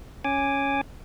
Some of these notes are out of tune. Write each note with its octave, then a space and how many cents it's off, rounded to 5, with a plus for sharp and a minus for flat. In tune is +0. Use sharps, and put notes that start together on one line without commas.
C#4 +0 G#5 -5 D6 +0